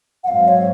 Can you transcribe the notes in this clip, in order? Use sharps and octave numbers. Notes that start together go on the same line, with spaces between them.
F#5
G#2 F#3 C4 F5
C#5